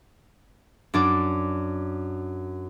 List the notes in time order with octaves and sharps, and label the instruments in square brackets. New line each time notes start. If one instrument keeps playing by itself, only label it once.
[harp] F#2 D4 D5 D6